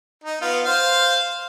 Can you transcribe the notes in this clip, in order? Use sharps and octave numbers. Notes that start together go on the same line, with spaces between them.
D#4
B3 F4
C5 F5